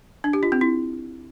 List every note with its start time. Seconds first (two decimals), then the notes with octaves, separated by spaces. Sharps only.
0.24 D4
0.33 G4
0.43 F4
0.52 C4
0.61 E4